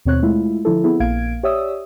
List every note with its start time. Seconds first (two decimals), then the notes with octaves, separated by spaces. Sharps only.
0.05 D#2 B2 C4 C#5 F#6
0.22 G#3 A3 E4 F4
0.65 D3 F3 E4 A4
0.84 B3 C4 E4 G#4
1.00 A#1 A#3 F5 G#6 D7
1.43 G4 C#5 D5 E5 D#6 E6